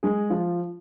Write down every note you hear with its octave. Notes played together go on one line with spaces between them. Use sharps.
G#3 G#4
F3 F4